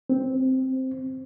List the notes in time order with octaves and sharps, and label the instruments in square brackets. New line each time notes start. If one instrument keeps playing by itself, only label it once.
[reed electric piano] C4